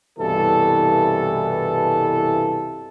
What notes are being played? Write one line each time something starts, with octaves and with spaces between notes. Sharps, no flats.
C2 G2 B2 E3 A4